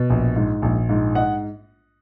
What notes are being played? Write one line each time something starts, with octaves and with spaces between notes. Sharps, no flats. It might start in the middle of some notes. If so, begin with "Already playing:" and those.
Already playing: B2
A#1
G#2
A#1
G#2
D#5 F#5